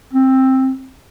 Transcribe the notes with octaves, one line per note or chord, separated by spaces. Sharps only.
C4